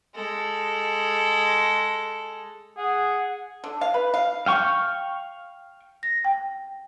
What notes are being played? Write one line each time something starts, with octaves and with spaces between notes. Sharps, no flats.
G#3 A4
G#4 F#5
D3
F5
B4
F5
F5 G5 C#6
A#6
G5